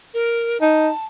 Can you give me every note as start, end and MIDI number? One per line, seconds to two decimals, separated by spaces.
0.14 0.60 70
0.61 0.90 63
0.61 1.06 81